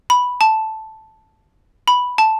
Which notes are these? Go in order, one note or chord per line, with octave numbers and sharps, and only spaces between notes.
B5
A5
B5
A5